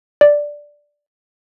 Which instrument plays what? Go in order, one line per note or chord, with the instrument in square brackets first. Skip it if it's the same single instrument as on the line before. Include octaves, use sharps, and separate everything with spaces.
[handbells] D5